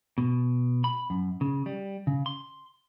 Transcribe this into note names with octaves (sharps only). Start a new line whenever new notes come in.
B2
B5
F#2
C#3
G3
C#3
C6